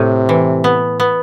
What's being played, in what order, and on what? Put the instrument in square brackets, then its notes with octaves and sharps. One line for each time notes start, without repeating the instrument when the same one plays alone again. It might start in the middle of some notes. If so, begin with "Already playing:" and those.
Already playing: [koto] A2 [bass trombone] C3
[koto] E3
B3
B3